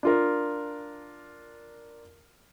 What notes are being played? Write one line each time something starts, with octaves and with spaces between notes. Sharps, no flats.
D4 F4 A#4